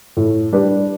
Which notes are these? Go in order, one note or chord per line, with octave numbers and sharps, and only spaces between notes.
A2
G3 D4 G4 B4